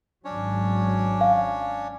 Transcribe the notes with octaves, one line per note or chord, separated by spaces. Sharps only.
G#1 F#3 C#4 D4 C#5
F5